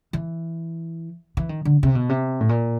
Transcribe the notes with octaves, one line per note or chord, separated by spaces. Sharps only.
E3
E3
D#3
D3
C3
B2
C3
A2
A#2